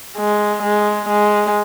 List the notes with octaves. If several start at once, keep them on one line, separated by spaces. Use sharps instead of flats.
G#3
G#3
G#3